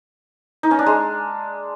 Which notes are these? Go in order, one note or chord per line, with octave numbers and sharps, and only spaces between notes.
D#4
C#4
D4
G#3